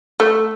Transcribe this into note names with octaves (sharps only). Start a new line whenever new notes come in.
A3